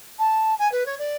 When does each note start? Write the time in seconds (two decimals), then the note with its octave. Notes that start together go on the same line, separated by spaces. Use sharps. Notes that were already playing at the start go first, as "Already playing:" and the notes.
0.18 A5
0.58 G#5
0.71 B4
0.85 C#5
0.98 D5